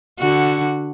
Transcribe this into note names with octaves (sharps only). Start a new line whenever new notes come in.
D3 F#4